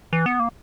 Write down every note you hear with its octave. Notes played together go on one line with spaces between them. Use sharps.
E3
B3
A#3